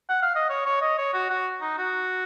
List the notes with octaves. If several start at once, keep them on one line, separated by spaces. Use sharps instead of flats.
F#5
F5
D#5
C#5
C#5
D#5
C#5
F#4
F#4
D#4
F#4